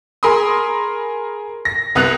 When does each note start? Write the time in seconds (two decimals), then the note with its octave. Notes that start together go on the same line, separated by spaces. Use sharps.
0.23 G#4 A#4 B5 C6 D#6
1.65 A#6
1.95 C2 B3 D#6 F#6 F7